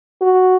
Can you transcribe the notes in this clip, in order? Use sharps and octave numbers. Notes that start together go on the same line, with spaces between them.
F#4